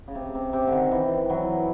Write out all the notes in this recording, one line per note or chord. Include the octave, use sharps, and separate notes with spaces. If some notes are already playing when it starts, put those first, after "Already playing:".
C#3
C3
C3
C3
D3
D#3
E3
E3 F#3